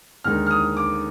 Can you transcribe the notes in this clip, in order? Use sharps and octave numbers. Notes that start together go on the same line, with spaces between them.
D#2 D3 G#3 D#4 F6
F6
D#6
D6